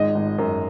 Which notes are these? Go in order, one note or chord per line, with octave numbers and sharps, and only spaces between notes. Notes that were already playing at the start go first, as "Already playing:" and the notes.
Already playing: G#1 G#3 D#5
G#1
F#2